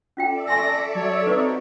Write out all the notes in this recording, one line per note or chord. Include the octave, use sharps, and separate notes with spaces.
C#4 F4 A4 D5 E5 G5
G#5 C6 C#6 A#6
F#3 C#5
C4 D#4 F#4 G4 B4 C#6 D6